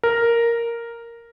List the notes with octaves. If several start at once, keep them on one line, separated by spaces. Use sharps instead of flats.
A#4